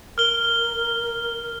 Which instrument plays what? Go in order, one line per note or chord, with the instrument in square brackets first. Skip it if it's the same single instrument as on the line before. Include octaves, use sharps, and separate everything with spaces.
[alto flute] A#4 [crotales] F6 G7